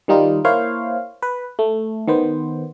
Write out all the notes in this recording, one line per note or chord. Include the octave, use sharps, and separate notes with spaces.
D#3 G3 D#4 F4
A#3 E4 C5 C#5 F5
B4
A3
D#3 B3 C5